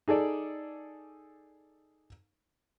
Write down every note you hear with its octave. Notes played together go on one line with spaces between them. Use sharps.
D#4 G#4 A4 D5